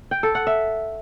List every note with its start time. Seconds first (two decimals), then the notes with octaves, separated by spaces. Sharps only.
0.11 G5
0.23 A4
0.35 F#5
0.47 E5